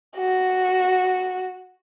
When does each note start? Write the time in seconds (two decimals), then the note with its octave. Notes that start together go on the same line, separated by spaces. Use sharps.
0.17 F#4